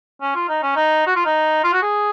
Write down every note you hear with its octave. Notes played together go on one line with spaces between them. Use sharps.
C#4
F4
D#4
C#4
D#4
F#4
F4
D#4
F4
F#4
G#4